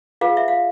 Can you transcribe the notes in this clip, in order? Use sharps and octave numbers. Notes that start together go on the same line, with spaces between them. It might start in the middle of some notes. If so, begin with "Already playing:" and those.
F4 G#4 B4 F5
E5
F5